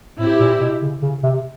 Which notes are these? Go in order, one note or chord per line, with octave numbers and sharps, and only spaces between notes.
A2 C4 E4 G4
A#2
B2
C#3
C#3
C3